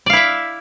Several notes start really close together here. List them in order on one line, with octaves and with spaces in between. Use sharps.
D5 F5 E4 E5